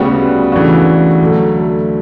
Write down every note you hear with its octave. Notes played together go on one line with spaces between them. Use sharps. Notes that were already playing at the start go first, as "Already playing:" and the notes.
Already playing: D2 C#3 G3 B3 F#4
C#3 E3 A3 D4 F#4
D2 D3 F#3 A3